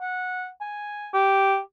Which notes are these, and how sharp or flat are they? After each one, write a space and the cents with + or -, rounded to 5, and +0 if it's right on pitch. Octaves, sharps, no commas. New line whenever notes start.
F#5 -15
G#5 -5
G4 -10